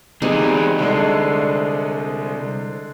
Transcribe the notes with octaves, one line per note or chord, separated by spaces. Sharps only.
E3 G3 G#3 C4 D#4
C2 D3 G#3